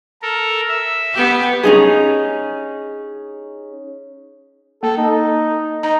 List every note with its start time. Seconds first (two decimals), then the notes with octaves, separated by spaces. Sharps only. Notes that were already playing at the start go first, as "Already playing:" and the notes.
0.22 A4 A#4
0.68 E5
1.13 B3 G4
1.63 C#4 D#4 G#4
4.83 A#3 A4
4.97 D#4
5.83 D#4 A#5